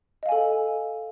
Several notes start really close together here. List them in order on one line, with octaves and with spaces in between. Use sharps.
D#5 F5 G#5 A4